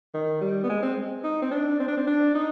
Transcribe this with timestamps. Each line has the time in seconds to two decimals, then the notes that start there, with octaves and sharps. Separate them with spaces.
0.14 D#3
0.41 G3
0.64 B3
0.69 G#3
0.83 C4
1.24 D#4
1.42 C4
1.51 D4
1.80 C4
1.88 D4
1.97 C4
2.07 D4
2.34 D#4